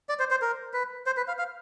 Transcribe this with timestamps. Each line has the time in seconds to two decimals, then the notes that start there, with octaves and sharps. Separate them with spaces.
0.09 D5
0.19 C5
0.31 C5
0.42 A#4
0.73 B4
1.06 C5
1.17 B4
1.28 F5
1.39 F5